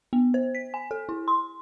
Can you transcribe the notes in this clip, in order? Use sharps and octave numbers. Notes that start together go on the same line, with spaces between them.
B3
C5
B6
G#5
A4
E4
C6